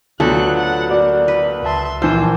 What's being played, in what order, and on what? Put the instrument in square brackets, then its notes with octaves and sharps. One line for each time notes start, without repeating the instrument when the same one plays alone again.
[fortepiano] D2 [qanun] F#3 B3 A4 [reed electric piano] F4 [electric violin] F#6
[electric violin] F#5
[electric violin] A#3 [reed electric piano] F#4 D5
[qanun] B4
[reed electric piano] C#2 A5 [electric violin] E5 C6
[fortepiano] A#1 E3 E6 [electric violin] F4 [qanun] C5